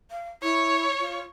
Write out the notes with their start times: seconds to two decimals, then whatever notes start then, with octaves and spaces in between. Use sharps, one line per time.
0.11 F5
0.42 E4 C#5
0.99 F4